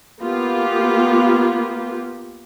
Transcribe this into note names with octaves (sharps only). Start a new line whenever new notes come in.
A#3 B3 F4 G4